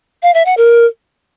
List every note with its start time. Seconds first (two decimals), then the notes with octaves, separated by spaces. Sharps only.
0.22 F5
0.34 E5
0.46 F#5
0.57 A#4